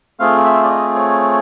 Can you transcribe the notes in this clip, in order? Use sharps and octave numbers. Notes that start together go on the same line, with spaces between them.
A3 C4 F4 G#4 F5
E5
D5
D#5
C#5